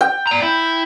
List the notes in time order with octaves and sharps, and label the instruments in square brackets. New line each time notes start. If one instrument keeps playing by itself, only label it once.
[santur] G5
[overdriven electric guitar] D5 A#5
E4